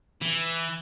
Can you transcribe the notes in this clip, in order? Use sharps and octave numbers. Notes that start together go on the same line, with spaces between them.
E3